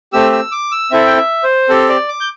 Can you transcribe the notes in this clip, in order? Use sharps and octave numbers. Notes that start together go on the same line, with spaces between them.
A3 C4 G4 E6
E6
D6
E6
C4 E4 A4 E5
G5
E5
C5
C4 G4 A4
D5
D6
G6